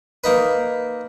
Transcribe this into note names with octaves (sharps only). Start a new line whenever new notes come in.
A#3 D#4 B4